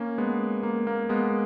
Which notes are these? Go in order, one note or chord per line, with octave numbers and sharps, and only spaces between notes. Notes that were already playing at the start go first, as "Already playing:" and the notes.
Already playing: A#3 C#4
G#3 B3
A#3
A#3
G#3 B3